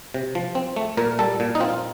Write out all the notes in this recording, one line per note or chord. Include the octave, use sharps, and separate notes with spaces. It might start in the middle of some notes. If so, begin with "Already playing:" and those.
C3
F3
C4
A3
A#2 A#4
G3 A4
A#2
D#4
C4 F4